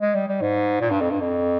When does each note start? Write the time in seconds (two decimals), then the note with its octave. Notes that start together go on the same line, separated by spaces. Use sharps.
0.01 G#3
0.15 G3
0.28 G3
0.41 G#2
0.81 A#2
0.90 G2
1.01 F2
1.11 G2
1.21 F2